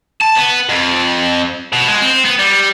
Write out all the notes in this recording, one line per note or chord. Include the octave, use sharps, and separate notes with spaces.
A5
B3
F2
B2
G#3
C4
B3
G3